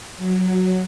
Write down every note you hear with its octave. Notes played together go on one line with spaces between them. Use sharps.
F#3